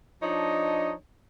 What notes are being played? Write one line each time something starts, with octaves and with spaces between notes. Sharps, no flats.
F3 D4 D#4 C#5 D#5